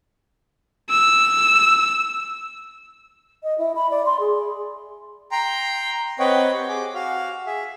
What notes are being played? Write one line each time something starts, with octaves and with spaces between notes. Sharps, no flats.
E6
D#5
E4
B5
D5
C6
G#4
G5 A#5 C6
C4 B4 C#5 D#5 F#5 G5
G4 C#6
G#4 D6
F#4 F5
G#4 E5